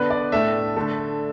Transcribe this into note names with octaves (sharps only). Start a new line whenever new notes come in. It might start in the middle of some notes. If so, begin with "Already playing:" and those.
Already playing: D3 B3 D4 B4
D5
A2 A3 D4 E5
D3 A3 D4